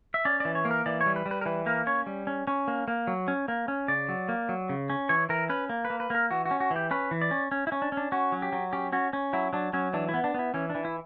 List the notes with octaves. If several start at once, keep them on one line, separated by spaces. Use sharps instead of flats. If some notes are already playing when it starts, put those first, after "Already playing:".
E5
C#4 D5
E3 D5
C#5
A#3
A#4
E3 D5
C#5
G3
B4
G3
B4
A#4
E3 B4
A#3 A#4
C#4 C#5
G3
C#4
C#4
A#3
A#3
F#3
C#4
A#3
C#4
C#3 D5
F#3
A#3
F#3
C#3
C#4
E3 C#5
E3 A#4
C#4 B4
A#3
B4
A#3
B4
A#3 A#4
E3 F#4
F#4
C#4
F#4
E3
G4
C#4 B4
E3
D5
C#4
C#4
E4
C#4
D4
C#4
D4
C#4 F#4
F#3
G4
F#3
C#4 G4
C#4 F#4
C#4
F#3 E4
F#3 D4
F#3 C#4
E3 D4
E4
B3
D4
B3 E4
E3 C#4
D4
E3
E4